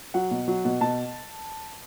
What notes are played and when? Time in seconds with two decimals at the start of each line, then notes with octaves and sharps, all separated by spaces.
0.14 F#3 F#5
0.31 B2
0.48 F#3
0.65 B2
0.81 B2 A5